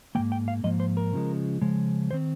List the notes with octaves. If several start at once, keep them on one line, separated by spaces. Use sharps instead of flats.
G#2 F3 A#3 G5
G5
F5
G#2 F3 A#3 D#5
C5
A#4
C#3 F3 G#3
C#3 F3 G#3
D#3 C4 C5